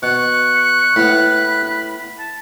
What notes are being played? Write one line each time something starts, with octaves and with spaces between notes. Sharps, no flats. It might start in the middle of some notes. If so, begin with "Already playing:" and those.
B2 C#6 F#6
A2 B3 B5
A5